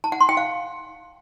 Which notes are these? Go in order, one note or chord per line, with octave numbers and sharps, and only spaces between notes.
A5
F#5
C6
G5
F5